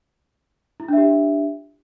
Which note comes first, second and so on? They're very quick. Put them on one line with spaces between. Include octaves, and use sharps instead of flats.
E4 F4 D4 E5 G4